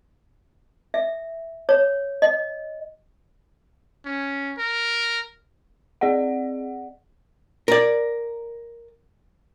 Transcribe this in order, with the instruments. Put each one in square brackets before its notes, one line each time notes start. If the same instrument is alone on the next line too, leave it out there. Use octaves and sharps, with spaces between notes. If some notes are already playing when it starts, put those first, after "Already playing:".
[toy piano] E5
C#5
D#5
[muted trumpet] C#4
A#4
[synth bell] C4 G#4 D5 D#5 F#5
[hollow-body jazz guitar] A#4 D5